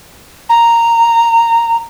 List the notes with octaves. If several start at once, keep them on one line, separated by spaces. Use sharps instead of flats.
A#5